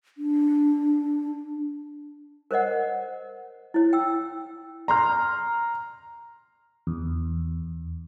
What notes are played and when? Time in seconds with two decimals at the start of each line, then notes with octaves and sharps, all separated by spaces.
0.18 D4
2.51 A#4 C5 C#5 D#5 F#5
3.74 E4 C#5
3.93 G5 E6
4.88 A#5 C6 F6
6.87 E2